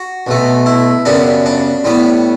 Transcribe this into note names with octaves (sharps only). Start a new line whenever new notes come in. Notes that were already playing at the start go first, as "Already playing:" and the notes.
Already playing: F#4
B1 B2 A3
E4
F#2 C#3 G3 B3 D4
D4
A2 G3 B3